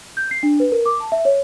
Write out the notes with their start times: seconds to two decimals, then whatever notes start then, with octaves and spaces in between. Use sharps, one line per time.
0.17 G6
0.31 C7
0.43 D4
0.60 B4
0.72 A#4
0.86 D6
1.00 A5
1.12 E5
1.25 C#5